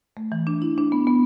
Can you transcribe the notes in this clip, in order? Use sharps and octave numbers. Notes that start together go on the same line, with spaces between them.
A3
E3
D4
E4
D4
B3
B3